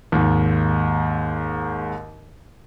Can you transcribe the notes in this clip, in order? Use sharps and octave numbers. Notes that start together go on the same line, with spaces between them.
D#2 G#2